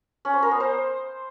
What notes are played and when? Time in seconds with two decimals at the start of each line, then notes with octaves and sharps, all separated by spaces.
0.25 C#4
0.34 C5
0.42 A#4
0.51 B3
0.60 C5